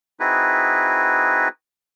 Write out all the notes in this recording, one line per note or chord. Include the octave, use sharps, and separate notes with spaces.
C4 D#4 E4 F#4 G#4 B4